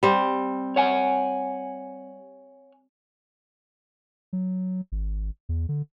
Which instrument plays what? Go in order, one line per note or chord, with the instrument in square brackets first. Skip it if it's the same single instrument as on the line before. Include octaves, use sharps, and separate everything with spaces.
[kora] G3 C4
[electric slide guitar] C#5 F#5 G#5
[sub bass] F#3
G#1
E2
D3